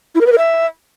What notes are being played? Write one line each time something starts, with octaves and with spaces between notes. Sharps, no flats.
E4
A#4
B4
A#4
E5